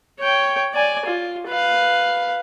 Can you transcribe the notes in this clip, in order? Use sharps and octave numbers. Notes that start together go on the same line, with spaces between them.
C#5 G5
D5 G#5
F4
B4 F5